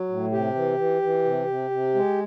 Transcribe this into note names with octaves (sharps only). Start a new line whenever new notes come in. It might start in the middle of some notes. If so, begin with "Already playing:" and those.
Already playing: F#3
A2
C3 G4
E3
E3
E3
C3
C3
C3
G#3